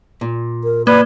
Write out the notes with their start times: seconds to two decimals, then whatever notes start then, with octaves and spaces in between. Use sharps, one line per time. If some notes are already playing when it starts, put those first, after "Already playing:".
0.21 A#2
0.64 A#4
0.87 A#3 B4 D5